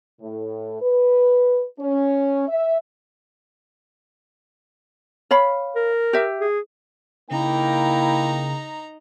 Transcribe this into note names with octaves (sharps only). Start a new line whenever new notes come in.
A2
B4
C#4
E5
C#5 F5 B5
A#4
G4 E5
G#4
C#3 A#3 D#4 E4 G5 A#5